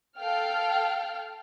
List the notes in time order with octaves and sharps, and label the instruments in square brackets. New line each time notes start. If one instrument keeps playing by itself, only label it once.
[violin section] A4 F5 G5 F6